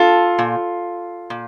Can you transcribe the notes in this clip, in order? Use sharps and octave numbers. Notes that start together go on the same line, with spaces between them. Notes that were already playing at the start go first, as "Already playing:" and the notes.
Already playing: F4 A4
A#2
A#2